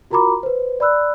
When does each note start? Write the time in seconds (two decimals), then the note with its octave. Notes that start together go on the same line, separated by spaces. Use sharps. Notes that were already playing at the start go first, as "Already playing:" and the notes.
0.11 F4 F#4 A#4 A#5 B5 D6
0.43 B4 C5
0.80 D5 B5 E6 F#6